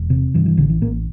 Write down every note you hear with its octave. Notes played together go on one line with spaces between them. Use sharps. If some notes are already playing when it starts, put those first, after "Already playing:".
Already playing: E1
C3
G2 E3
E3
A1 D3
E3
A1 A#3